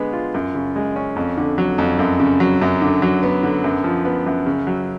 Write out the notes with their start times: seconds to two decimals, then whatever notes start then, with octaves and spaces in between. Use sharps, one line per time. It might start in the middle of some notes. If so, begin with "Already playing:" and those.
Already playing: D3 G#3 B3
0.13 F4
0.34 F#2
0.55 C#3
0.76 G#3
0.96 C#4
1.16 F2
1.37 D3
1.58 F#3
1.78 F2
1.99 F#2
2.20 C#3
2.40 F#3
2.61 F#2
2.81 D3
3.02 F#3
3.23 B3
3.43 D3
3.64 F#2
3.84 F3
4.05 B3
4.26 F#2
4.46 C#3
4.67 F#3